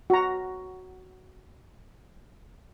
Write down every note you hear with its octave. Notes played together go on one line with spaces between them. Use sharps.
F#4 A#5